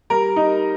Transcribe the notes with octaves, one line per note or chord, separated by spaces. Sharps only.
G3 A#4
D#4